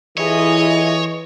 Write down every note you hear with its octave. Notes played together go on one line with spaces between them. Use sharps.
E3 E4 F4 G#4 A4 C#5 D#5